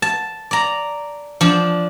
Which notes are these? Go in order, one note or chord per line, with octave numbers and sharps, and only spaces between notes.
A5
D5 A#5
F3 D4